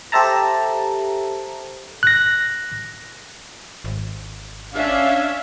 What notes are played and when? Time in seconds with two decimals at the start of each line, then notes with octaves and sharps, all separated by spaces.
0.12 G4 A4 C5 E5 A5 A#5
2.03 F#6 A#6
3.84 G#1
4.74 C#4 D4 E5 F5